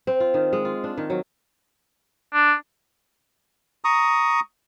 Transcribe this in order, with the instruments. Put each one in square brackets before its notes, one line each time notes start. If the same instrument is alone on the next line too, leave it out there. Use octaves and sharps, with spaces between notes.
[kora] C4
F4
D#3
G#3
F4
D4
D#3
F#3
[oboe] D4
[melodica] A#5 C#6 D#6